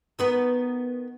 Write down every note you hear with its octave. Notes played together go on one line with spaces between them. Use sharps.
D#3 B3 B4